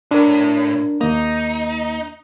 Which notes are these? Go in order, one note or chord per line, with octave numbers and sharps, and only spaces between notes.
A2 D4 A#4
D#2 A#3 D#4